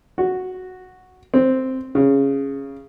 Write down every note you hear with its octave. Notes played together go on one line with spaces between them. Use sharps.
F#4
C4
C#3